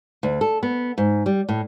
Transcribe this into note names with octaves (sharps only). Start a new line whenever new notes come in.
D2
A4
B3
G#2
G3
A2